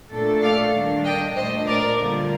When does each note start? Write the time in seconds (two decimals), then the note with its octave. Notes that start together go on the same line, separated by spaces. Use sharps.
0.11 A#2 A3 D4 A4
0.43 D5 F5
0.74 D#3 G3 A#3 D4
1.06 D#5 G5
1.36 A#2 A3 D4 C5 D#5
1.67 A#4 D5
1.99 D3 G3 A#3 F4